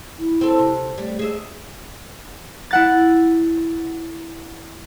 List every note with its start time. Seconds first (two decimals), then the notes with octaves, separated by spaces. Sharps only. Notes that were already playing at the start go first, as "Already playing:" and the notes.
0.19 E4
0.41 C4 A4
0.59 C3
0.98 G3 A3
1.19 G#4 E5
2.71 E4 F#5 A6